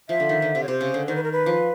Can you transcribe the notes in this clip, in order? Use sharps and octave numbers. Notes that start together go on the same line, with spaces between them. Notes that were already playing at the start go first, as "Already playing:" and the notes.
F3 E5
D3
D#3
D3
C3
C#5
C3 C5
C#3
D3
D#3 C5
B4
A#4
B4
F3